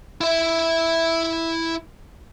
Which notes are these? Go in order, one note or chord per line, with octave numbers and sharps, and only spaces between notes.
E4 E5